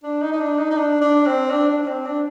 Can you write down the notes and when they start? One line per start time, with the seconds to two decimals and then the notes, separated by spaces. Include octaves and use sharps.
0.03 D4
0.22 D#4
0.32 D#4
0.40 D4
0.59 D#4
0.71 D#4
0.77 D4
1.01 D4
1.26 C4
1.50 D4
1.68 D4
1.82 D4
1.87 C4
2.06 D4